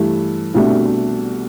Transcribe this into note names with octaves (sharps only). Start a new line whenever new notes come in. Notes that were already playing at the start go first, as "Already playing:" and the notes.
Already playing: G2 E3 A3
C2 B2 A3 D4